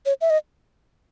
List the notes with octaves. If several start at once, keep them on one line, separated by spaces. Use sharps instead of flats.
C#5
E5
D#5